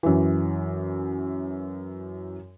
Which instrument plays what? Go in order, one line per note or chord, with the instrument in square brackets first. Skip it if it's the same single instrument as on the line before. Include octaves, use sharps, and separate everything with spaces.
[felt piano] F#2 E3